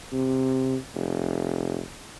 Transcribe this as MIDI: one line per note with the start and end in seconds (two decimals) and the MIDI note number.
0.13 0.76 48
0.95 1.82 29